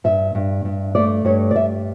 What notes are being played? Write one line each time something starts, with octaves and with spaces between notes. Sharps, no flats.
G2 E5
G2
G2
A3 D5
G2 C#5
D5
G2 E5